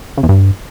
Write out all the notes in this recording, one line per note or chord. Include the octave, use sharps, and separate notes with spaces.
C#3
E2
G2